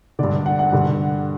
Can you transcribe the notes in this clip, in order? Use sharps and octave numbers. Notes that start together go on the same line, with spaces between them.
G2 D3 D5
F#5
F#5
G2 D3